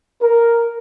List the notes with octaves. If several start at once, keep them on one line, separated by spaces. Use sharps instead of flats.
A#4